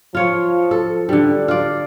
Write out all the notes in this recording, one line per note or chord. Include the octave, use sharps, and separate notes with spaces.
F3 F4 C#5
A4
D3 G3 D4
F4 D5